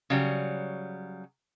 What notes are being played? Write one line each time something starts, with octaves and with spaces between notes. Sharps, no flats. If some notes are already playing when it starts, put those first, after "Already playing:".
C#3 F#3 G3